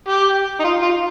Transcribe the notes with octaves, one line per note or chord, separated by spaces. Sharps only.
G4
D#4
F4
F4